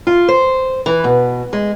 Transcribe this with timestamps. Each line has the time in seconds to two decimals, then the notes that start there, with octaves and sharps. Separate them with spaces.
0.07 F4
0.28 C5
0.86 E3
1.04 B2
1.53 G#3